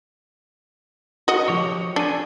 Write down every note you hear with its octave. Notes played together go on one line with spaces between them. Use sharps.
F#4 D#5
F3 G4 C#5
D4 A4 G#5